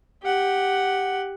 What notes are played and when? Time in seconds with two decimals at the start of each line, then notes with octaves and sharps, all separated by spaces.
0.23 G4 F#5